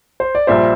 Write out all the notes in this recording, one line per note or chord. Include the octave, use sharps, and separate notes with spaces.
C5
D5
A#1 A#2 G3 C5 E5